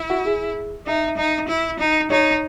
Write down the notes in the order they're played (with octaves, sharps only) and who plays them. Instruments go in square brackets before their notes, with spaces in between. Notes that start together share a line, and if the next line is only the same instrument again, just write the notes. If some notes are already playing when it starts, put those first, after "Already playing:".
Already playing: [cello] E4
[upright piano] F#4
G#4
[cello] D#4 [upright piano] E5
[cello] D#4
E4
D#4
[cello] D#4 [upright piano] C#5